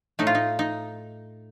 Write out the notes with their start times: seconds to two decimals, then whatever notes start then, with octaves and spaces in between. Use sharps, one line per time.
0.19 A2 A3 D#4
0.27 F4
0.35 D#4
0.59 D#4